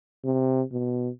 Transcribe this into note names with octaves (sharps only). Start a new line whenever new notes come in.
C3
B2